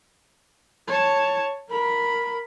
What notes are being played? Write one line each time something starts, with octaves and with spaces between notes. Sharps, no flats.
C#5 A5
A#4 B5